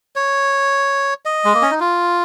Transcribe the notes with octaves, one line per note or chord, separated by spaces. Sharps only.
C#5
D#5
G#3
A#3
C#4
D#4
F4